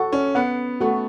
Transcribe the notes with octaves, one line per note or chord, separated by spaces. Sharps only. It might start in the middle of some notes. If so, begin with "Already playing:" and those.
Already playing: F#4 A4
C#4
B3 F#5
A3 F#4